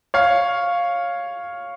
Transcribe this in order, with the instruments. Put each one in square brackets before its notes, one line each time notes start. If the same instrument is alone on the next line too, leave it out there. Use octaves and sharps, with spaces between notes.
[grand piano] C#5 F5